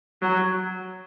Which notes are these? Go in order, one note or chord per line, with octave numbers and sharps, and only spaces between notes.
F#3